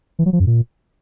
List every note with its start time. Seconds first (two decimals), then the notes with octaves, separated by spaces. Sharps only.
0.19 E3
0.26 F#3
0.33 F3
0.40 F#2
0.47 A#2